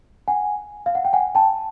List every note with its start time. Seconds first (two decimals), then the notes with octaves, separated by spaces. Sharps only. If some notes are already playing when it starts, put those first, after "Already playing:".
0.28 F#5 G#5
0.86 F5
0.95 F#5
1.05 G5
1.13 F#5 G#5
1.35 G5 A5